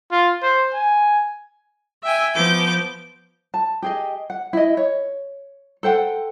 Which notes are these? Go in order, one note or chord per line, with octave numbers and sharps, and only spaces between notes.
F4
C5
G#5
E5 G5 G#5
F3 B3 D6 G6
A5
G4 G#4 D#5
F#5
E4 D#5
C#5
A4 C5 F#5 G5